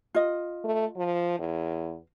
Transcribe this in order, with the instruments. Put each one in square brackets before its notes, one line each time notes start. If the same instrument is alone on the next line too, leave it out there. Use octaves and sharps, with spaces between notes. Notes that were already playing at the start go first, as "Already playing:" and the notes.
[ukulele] F4 D#5
[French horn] A3
F3
E2